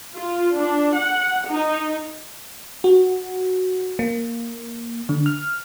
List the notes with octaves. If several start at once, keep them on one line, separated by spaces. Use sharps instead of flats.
F4
D4
F#5
D#4
F#4
A#3
D3
F6